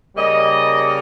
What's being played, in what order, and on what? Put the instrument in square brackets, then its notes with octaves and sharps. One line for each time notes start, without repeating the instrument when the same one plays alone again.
[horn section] C#3 G3 A#3 D#5